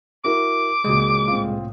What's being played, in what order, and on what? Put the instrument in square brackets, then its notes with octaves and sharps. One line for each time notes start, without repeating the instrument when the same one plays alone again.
[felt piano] E4 F#4 A#4 [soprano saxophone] D6
[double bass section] C#2 A#2 C#3 [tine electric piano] G#3 [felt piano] F#4 D#6
[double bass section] C2 A2 [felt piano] C4 F4